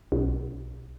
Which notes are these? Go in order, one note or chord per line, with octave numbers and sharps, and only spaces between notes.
B1